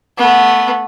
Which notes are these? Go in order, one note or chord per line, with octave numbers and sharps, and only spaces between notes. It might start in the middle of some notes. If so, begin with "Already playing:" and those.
A3 B3